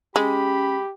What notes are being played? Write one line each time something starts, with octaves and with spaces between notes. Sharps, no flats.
G#3 C#4 G4 B5